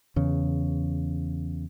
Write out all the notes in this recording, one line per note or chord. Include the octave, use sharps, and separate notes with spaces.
E2 C#3